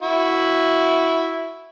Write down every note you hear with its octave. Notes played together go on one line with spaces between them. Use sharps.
E4 F#4